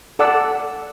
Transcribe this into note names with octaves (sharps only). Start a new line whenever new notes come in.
A4 D5 F#5 A5 E6